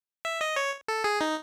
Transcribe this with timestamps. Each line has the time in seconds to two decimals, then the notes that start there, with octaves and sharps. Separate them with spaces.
0.25 E5
0.41 D#5
0.56 C#5
0.88 A4
1.04 G#4
1.21 D#4